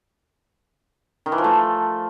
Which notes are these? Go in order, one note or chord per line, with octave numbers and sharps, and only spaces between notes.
D#3
E3
F3
A3